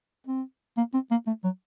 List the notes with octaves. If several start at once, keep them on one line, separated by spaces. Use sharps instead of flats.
C4
A#3
C4
A#3
A3
F#3